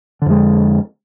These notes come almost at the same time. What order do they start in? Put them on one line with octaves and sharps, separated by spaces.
D3 F2 G#3